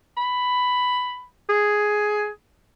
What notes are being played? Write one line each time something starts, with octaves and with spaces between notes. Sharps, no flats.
B5
G#4